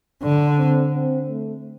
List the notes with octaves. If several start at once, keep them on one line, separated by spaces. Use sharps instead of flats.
D3 D4
C4
C4
A3